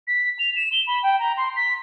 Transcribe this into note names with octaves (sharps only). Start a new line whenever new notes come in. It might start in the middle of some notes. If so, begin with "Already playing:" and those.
B6
F7
E7
G7
B5
G5
A#5
C6
B6